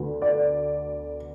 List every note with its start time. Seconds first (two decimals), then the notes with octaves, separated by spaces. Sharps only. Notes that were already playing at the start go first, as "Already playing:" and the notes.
Already playing: D2 D3 B3
0.22 D5